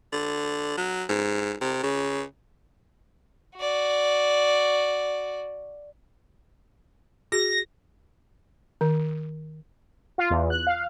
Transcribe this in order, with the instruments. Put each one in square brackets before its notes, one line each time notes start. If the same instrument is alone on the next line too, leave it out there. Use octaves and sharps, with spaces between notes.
[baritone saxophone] D3
F#3
G#2
C3
C#3
[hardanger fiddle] F#4 D5
[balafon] F#4 G#4 [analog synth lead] A#6
[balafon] D#3
[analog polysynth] F4
E2
F#6
F5